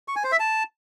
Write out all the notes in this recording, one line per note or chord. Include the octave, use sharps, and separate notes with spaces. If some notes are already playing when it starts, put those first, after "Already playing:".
C#6
G#5
C5
E5
A5